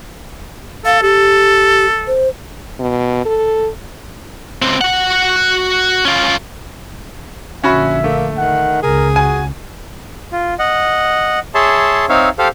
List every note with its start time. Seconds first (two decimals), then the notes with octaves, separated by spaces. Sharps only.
0.85 A4 F5
1.02 G4 A4
2.07 C5
2.80 B2
3.26 A4
4.62 C#2 C4
4.81 F#4 F#5
6.05 C#4 F4
7.64 A#1 D3 C#4 F#4 E5 B5
8.04 A3 A#3
8.37 D#3 F#5
8.82 C#2 C#3 G#4 A#4
9.16 F#4 G#5
10.32 F4
10.59 D#5 F#5
11.55 G#4 C#5 E5 A5 C6
12.09 C4 D#4 C#5 E5 F5
12.38 G4 A4 C5 F5